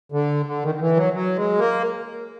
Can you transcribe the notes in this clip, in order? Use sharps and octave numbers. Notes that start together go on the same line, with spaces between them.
D3
D3
D#3
D#3
E3
F#3
F#3
G#3
A#3